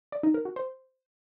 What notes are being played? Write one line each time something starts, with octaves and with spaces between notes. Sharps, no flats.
D5
D#4
A#4
F#4
C5